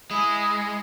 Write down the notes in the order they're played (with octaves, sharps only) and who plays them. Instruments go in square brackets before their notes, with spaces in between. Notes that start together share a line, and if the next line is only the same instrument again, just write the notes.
[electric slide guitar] G#3 [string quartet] E4 G#5 [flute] D#6